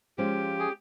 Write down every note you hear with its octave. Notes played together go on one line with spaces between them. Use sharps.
F3 G#3 C#4 F4 G4
G#4